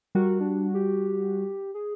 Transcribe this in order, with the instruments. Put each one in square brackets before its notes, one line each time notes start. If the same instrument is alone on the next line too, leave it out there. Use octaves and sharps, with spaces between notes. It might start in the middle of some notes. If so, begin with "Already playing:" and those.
[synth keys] G3 F#4 [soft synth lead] A#4
[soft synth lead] D4
G4
G#4